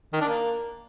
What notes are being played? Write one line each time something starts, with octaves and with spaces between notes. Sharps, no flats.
D#3
D4
A#3